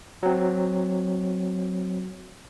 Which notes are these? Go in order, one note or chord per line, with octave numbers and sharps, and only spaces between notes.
F#3 C4